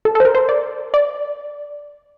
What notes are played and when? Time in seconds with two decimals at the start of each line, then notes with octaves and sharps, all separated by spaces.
0.05 A4
0.15 A4
0.20 C5
0.25 A#4
0.35 C5
0.49 D5
0.94 D5